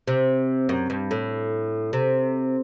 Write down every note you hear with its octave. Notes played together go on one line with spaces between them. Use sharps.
C3
F#2
G2
A2
C3